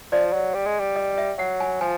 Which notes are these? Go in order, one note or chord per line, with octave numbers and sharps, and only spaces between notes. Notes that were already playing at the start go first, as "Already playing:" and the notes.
F3 D5
F#3
G3
G#3
G3
D#5
E5
F#3 F#5
G#5
F3 G#5